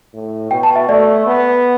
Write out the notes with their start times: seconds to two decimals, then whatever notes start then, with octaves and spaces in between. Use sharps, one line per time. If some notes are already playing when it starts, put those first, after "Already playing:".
0.13 A2
0.51 B2 G5
0.63 A5
0.76 E5
0.89 A3 D5
1.27 B3